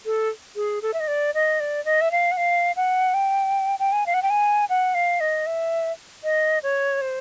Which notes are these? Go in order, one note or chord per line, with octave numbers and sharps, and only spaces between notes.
A4
G#4
A4
E5
D#5
D5
D#5
D5
D#5
E5
F5
F#5
F5
F#5
G5
G5
G#5
F5
F#5
G5
G#5
F#5
F5
D#5
E5
D#5
C#5
C5